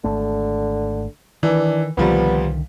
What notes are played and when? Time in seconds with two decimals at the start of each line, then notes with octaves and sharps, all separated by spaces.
0.04 G#1 D3 A3
1.43 D#3 E3 D4
1.97 C2 A#2 D3 D#3 F3 G3 B3